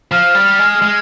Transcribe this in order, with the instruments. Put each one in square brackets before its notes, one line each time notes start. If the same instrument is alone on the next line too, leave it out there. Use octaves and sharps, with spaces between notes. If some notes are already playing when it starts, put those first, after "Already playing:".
[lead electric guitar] F3 [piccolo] F6
[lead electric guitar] G3
G#3
G#3